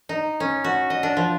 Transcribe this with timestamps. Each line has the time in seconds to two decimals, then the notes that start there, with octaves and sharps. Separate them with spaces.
0.09 D#4
0.40 C#4
0.64 F#4
0.90 D#5
1.03 D4
1.17 F3